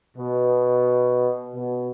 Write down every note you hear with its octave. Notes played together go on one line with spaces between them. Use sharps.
B2
B2